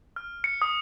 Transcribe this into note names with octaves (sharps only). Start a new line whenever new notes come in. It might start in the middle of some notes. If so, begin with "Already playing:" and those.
F6
C#7
D#6